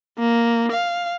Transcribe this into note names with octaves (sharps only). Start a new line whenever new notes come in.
A#3
F5